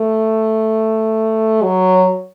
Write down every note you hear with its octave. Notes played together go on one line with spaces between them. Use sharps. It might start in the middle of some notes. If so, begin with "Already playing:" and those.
Already playing: A3
F#3